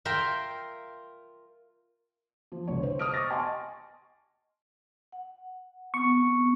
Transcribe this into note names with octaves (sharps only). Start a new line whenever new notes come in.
F4 A#4 E5 G5 C6
F3
C2 D3 G#3 C#5
C5
D#6 F6 D7
C#6 D6 F6 A6 A#6
D#5 G#5 A5 C6 C#6
F#5
B3 C4 C#6